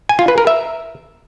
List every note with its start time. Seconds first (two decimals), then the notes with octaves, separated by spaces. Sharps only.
0.09 G#5
0.19 F4
0.28 B4
0.38 A#4
0.47 E5